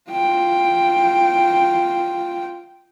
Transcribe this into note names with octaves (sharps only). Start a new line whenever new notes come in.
F4 G5